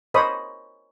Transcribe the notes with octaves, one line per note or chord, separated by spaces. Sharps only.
A#4 C5 C#5 D#5 B5 D#6